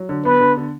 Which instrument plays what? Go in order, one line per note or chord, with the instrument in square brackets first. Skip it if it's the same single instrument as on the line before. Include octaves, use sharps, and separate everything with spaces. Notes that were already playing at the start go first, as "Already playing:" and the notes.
Already playing: [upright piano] F#3
D3
[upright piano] B3 [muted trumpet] B4
[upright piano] D3
D3